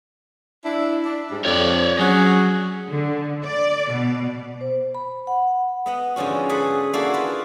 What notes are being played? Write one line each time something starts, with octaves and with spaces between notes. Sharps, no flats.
D4 E4
D4
G#2 G3
F2 C#5 D5
F#3 C#4 F#4 G#4
D3
D5
B2
C5
B5
F#5
B3 D#5 F#5
G#2 D3 F3 C#4 F#4
G#4 A4 B4 F#5
A#3 D4 E4 F#4 G#4 A4
F4 B4